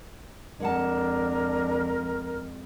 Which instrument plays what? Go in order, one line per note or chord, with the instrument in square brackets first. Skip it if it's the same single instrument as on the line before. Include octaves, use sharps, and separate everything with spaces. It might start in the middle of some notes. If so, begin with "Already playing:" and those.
[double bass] F2 [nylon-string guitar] G#3 F#5 A5 [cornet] D4 [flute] A#4